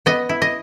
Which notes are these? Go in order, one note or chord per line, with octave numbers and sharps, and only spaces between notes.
B3 D#5
E4
D#5